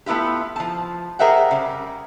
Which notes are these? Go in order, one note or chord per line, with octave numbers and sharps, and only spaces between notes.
A3 B3 E4 F4 G4
F3 A5
G#4 A#4 C5 E5 F#5 G5
C#3 G3